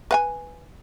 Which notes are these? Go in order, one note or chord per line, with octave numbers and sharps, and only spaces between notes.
B4 F#5 G#5